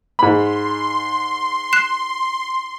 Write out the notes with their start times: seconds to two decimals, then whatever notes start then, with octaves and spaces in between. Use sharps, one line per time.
0.19 G#2 B5 C6
1.73 F#6 C7 E7